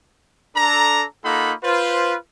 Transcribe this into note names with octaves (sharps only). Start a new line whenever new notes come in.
D4 A4 A#5
A#3 D#4 F4 A4 F#5 B5
F4 B4 C5